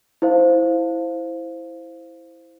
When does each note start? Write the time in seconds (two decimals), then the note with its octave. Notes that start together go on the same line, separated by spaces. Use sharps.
0.22 E4 C5 F5